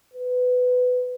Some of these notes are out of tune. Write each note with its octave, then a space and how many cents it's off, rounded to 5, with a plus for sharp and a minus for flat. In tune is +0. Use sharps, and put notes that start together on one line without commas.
B4 +15